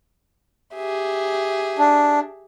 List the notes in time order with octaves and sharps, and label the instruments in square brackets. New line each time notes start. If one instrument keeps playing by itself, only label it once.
[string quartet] G4 G#4 E5
[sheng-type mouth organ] D4